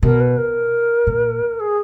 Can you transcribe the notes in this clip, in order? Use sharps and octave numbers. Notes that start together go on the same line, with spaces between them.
B2 A#4
B4
A#4
A#2
G#4